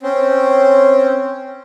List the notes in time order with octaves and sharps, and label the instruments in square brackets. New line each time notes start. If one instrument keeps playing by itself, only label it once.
[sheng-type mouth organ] C4 C#4